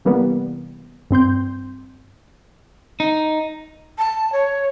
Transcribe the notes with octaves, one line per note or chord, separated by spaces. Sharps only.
C3 E3 G3 A#3 B3
G2 C4 C6 G6
D#4
A5
C#5